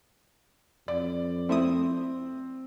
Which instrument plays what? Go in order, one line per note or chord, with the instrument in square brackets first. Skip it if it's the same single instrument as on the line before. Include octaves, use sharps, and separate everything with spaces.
[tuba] F2 [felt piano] D5
[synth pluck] A3 E4 D#6 [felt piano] C4